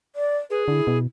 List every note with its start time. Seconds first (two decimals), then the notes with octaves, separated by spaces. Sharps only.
0.16 D5
0.50 G#4 B4
0.68 D3 E4
0.87 B2